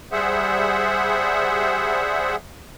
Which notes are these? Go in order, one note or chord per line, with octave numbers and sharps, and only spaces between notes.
G3 G#4 C5 E5 F#5